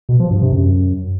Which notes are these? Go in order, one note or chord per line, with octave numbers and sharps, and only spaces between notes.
B2
F3
G2
C3
F#2